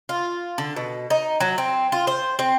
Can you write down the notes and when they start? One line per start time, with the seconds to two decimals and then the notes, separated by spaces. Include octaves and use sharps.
0.09 F4
0.58 D3
0.76 B2
1.10 D#4
1.40 F#3
1.58 C4
1.92 F4
2.07 C5
2.39 C4